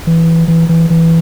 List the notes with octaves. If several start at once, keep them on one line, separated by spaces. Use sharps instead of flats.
E3
E3
E3
E3